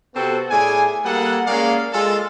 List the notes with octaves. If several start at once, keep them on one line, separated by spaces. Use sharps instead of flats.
C3 B3 C4 F#4 A4
A2 G#4 D5 G#5
G3 A#3 G#4 A4 F#5
G#3 A#3 C#4 G#4 D5 F5
G#3 F4 A4